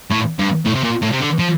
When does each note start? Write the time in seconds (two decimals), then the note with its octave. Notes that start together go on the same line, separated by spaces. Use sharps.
0.11 A2
0.39 G2
0.66 A2
0.75 C3
0.84 A#2
1.02 A2
1.13 C3
1.20 D3
1.39 F3